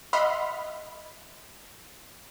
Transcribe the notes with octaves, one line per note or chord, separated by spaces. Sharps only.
D#5 E5 F#5 B5 C6 F6